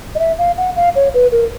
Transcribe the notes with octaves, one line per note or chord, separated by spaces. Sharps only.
D#5
E5
F5
F#5
F5
C#5
B4
A#4